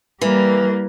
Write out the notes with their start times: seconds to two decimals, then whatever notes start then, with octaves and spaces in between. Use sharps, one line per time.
0.21 E3 G3 A#3